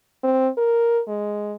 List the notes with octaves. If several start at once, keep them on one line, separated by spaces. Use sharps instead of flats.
C4
A#4
G#3